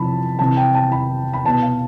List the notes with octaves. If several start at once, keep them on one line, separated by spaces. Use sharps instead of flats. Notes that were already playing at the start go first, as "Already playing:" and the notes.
Already playing: C3 F3 A5 B5
C3 E3 A5
G5
A5
B5
B5
B2 A5
F5